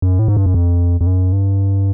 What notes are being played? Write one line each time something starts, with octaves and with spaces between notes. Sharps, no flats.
F#2
A2
G#2
G2
F#2
F2
F2
F#2
G2